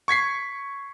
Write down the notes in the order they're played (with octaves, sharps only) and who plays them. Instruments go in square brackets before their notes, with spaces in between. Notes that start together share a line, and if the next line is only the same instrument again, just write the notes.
[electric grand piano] C#6 G#6 B6 C7